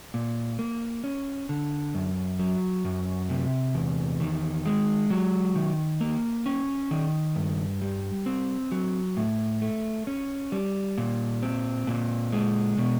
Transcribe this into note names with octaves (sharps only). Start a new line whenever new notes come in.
A#2
A#3
C#4
D3
F#2
F#3
F#2
C3
E2
D#3
G#3
F#3
D#3
A#3
C#4
D#3
G2
G3
C4
F#3
A2
A3
C#4
G3
A#2
C4
A#2
G#3
B2